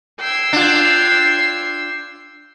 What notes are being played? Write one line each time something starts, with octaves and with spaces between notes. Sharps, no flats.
G5 E6 G#6 C7
D4 F4